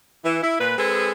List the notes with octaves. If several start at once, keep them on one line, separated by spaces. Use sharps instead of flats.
E3
E4
A#2 B4
G#3 C4 G#4 A4 B4